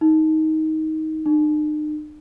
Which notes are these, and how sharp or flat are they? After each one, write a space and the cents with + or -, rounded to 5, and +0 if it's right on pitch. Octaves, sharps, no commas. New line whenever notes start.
D#4 +15
D#4 -45